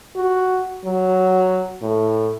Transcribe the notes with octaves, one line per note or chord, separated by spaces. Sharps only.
F#4
F#3
A2